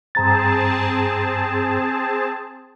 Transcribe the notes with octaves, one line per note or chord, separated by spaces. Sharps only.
G2 C4 G#4 A5 A#5 A6